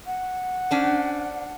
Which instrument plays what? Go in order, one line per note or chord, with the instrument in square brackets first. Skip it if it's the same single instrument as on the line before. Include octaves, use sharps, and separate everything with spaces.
[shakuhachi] F#5
[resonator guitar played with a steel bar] C#4 D4 C5